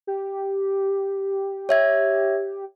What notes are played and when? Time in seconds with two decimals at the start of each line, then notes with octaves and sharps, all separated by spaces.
0.07 G4
1.69 C#5 E5 G#6